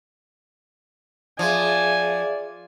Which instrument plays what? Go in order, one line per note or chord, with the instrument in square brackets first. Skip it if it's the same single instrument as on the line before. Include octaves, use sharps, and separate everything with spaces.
[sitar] F3 [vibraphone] G#4 E5 F5 [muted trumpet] D5 [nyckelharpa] G#5